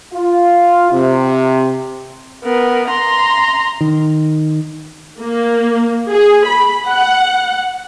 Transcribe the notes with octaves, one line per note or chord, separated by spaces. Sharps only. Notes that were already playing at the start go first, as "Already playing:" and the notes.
F4
C3
B3 A#4
A#5 C6
D#3
A#3
G#4
B5
F#5